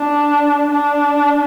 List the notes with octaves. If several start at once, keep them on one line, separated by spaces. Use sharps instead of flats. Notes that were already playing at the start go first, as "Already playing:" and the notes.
Already playing: D4
D4